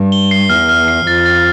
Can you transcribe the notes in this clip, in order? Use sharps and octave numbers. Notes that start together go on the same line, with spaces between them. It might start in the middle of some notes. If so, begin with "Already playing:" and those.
Already playing: G2
G7
C7
E2 F6
F6
C7
F2 A6
A6